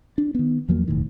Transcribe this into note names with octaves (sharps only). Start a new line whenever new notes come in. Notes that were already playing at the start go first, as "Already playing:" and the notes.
D4
D#3 B3
E2 F3 F#3 A#3
E1 D#2 A2 D#3